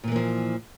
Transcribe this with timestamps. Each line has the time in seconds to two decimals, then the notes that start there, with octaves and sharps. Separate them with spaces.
0.04 A#2
0.08 E3
0.12 A#3
0.16 F3